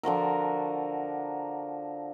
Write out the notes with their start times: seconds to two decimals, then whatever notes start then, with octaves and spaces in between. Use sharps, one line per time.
0.03 D3 F3 F#4 A#4